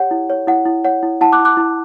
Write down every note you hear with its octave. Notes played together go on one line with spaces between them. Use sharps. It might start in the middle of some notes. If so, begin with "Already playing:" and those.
Already playing: G4 C#5 F#5
E4
C#5
E4 F#5
E4
C#5 F#5
E4
E4 F#5 A5
D6 F#6
E4
D6 F#6
E4